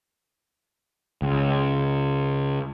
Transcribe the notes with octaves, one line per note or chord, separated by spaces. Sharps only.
C#2